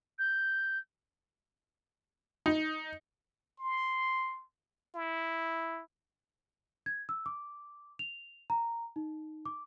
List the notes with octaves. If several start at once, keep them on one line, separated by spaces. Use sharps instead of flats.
G6
D#4
C6
E4
G#6
E6
D6
F7
A#5
D#4
D6